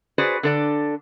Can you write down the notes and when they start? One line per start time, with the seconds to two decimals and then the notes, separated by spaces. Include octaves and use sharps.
0.18 F#4 G#4 B4 C5 D5
0.43 D3 A4 D5